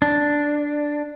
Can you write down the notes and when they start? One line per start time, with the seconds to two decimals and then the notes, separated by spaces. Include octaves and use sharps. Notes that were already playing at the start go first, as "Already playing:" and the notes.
0.02 D4